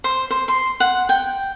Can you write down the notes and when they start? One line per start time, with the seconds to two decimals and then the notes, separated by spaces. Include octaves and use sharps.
0.04 C5
0.31 C5
0.48 C6
0.80 F#5
1.09 G5